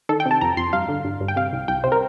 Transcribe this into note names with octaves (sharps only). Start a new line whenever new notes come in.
D#3 A4
G5
C3
A5
F2 A#5
F2 C6
G2 F5
D3
G2
G2
G5
C3 F5
C2
C2 G5
C3 C5
A#4